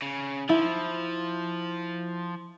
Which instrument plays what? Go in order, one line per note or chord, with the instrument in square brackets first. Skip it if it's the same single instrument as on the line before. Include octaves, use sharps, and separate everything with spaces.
[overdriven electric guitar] C#3
[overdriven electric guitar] F3 [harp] E4